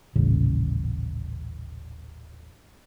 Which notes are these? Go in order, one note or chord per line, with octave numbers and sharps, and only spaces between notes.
D#1 A1 C#3